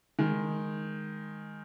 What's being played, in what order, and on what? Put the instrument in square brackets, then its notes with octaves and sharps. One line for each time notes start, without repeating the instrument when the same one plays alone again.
[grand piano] D#3 G#3